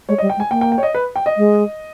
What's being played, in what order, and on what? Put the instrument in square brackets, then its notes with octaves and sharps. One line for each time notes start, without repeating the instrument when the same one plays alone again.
[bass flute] G#3 [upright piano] C#5
[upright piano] D#5
[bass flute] G3
[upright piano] G5
[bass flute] G#3
[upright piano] G#5
[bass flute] A#3 [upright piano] G5
[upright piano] G5
G5
C#5
D#5
B4
G5
D#5
[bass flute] G#3